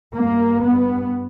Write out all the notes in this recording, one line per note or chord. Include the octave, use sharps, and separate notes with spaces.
G2 A#3
G2 B3